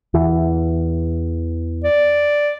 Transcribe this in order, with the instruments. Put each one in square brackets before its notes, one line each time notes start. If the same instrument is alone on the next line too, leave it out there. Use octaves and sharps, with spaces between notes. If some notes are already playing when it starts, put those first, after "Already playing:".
[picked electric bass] E2 E3
[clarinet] D5